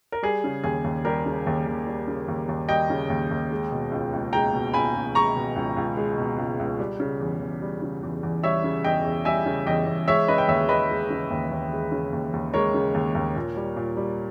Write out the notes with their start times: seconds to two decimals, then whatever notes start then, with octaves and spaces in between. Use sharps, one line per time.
0.12 A#4
0.22 G3 G#4
0.44 C#3
0.64 D#2 G#4
0.84 D#2
1.05 G3 G4 A#4
1.26 C#3
1.46 D#2
1.67 D#2
1.87 G3
2.08 C#3
2.28 D#2
2.48 D#2
2.68 G3 D#5 G5
2.90 C#3
3.10 D#2
3.31 D#2
3.51 G#3
3.71 B2
3.91 C#2
4.13 C#2
4.33 G#3 G5 A#5
4.54 B2
4.74 C#2 G#5 B5
4.95 C#2
5.15 G#3 A#5 C#6
5.35 B2
5.56 C#2
5.77 C#2
5.97 G#3
6.18 B2
6.38 C#2
6.59 C#2
6.79 G3
7.00 C#3
7.20 E2
7.40 E2
7.62 G3
7.82 C#3
8.03 E2
8.23 E2
8.43 G3 C#5 E5
8.64 C#3
8.84 E2 D#5 G5
9.05 E2
9.25 G3 E5 G#5
9.46 C#3
9.66 E2 D#5 G5
9.86 E2
10.08 G#3 C#5 E5
10.28 C#3 B4 D#5
10.38 G5
10.48 D#2 C#5 E5
10.68 D#2 B4 D#5
10.89 G#3
11.10 C#3
11.31 D#2
11.51 D#2
11.72 G#3
11.92 C#3
12.12 D#2
12.33 D#2
12.54 G#3 A#4 C#5
12.74 C#3
12.94 D#2
13.15 D#2
13.36 A#2
13.56 G3
13.76 A#2
13.97 G3